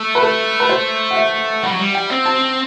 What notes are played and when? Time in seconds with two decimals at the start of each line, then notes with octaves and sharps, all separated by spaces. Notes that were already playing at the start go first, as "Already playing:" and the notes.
Already playing: A3
0.15 B4
0.23 A4
0.60 B4
0.69 C5
1.11 F#5
1.16 E5
1.64 G3 F#5
1.71 F#3
1.79 G3
1.95 G5
2.11 C4
2.26 A5